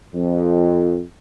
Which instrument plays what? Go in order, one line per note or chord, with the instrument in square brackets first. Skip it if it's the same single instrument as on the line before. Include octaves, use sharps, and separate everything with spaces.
[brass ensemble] F2